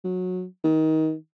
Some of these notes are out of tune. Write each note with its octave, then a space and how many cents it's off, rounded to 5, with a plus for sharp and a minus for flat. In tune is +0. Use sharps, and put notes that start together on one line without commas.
F#3 -20
D#3 +25